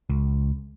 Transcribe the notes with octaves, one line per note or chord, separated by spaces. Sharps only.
C#2